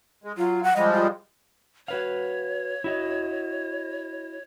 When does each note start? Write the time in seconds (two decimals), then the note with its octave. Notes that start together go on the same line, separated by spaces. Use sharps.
0.24 G#3
0.37 F#3 F4
0.64 F#5
0.76 F3 G3 G#3 D#5
0.92 F4
1.88 F#4 B4 C#5 F5
2.84 E4 F#4 D#5